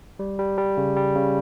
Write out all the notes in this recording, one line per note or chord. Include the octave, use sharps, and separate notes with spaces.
G3
G3
G3
C#3
G3
C#3